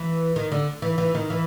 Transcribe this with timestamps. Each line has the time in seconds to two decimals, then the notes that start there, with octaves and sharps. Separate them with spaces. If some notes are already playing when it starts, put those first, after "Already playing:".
Already playing: E3
0.36 D#3
0.52 D3
0.82 E3
0.98 E3
1.15 D#3
1.30 E3